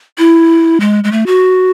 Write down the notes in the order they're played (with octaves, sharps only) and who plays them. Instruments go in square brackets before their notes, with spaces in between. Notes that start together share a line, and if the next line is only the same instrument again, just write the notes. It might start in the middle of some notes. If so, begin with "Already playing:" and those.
[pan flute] E4
G#3
G#3
A3
F#4